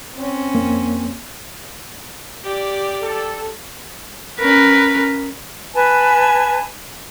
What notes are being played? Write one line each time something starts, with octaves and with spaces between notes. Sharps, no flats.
C4 C#4
F2 A#3
G4 D5
A4
C#4 A#4 B4
B4 G#5 A5